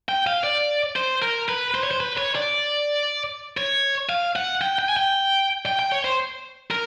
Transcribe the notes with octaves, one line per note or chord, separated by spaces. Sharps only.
G5
F5
D5
C5
A#4
B4
C5
C#5
C5
B4
C#5
D5
C#5
F5
F#5
G5
G5
G#5
G5
G5
G5
C#5
C5
A#4